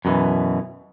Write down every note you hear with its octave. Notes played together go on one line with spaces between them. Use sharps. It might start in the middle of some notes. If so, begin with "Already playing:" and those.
F#2 B2 D#3 E3